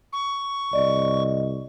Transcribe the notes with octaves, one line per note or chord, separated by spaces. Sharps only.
C#6
C2 D5 D#5